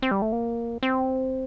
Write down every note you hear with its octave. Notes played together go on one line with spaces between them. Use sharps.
C4
G3
A3
A#3
C4